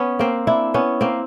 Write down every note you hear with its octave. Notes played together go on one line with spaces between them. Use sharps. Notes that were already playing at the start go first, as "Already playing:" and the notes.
Already playing: B3 C#4
A#3 C4
D4 E4
B3 C#4
A#3 C4